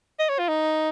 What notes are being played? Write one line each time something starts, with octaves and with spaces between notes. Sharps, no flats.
D#5
C#5
F4
D#4